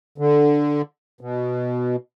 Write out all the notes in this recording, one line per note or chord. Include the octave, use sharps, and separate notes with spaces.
D3
B2